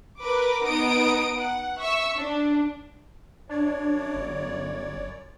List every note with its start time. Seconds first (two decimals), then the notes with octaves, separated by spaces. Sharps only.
0.21 A#4 B4 D6
0.64 B3 D#4 D#6 D7
1.36 F#5
1.80 E5 C#6 E6
2.18 D4
3.49 F#2 D4 C#5 D5
4.15 G1